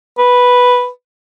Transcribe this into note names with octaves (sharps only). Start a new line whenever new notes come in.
B4